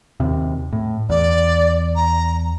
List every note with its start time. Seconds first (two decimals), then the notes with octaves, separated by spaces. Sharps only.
0.20 D#2 C3
0.73 A2
1.09 E2 D5
1.96 A#5